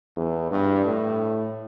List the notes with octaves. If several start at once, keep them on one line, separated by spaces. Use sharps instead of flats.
E2
G2
A2